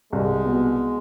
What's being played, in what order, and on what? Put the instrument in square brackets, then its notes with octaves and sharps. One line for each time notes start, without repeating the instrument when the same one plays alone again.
[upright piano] C2 [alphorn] G#3
[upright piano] B2